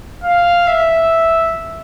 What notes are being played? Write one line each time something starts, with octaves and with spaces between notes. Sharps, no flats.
F5
E5